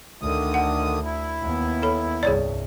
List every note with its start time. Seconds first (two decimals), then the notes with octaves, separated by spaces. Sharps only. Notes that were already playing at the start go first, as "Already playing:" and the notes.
0.22 D2 D3 D#3 D#6
0.54 F#5
1.04 E4
1.42 D#2 B3
1.82 A4 C#5 B5
2.23 C2 G2 G#4 C#5 D5